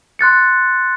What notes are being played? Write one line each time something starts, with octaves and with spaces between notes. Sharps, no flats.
C6 F#6 A6 C#7